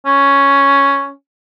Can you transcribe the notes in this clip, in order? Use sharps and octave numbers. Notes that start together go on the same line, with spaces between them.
C#4